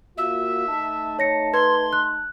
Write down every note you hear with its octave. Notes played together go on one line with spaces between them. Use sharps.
A#3 F4 F#4 E5
A3 D#4 A5
C#5 A#6 C#7
B4 C6 G#6
F#6